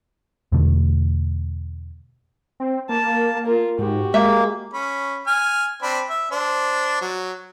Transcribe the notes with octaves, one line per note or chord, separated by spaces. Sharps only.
E2 B2 D3 A3
C4
A#3 A5
F4 A#4
G#2 F#4 G4
G#3 A#3 E5
C#4 B5
G#5 F6
C4 D4 B5
E5
D4 C5
F#3